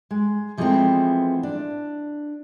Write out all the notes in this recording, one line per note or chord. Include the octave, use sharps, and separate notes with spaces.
G#3
E3 F3 G#3 A3 B3 C4
D4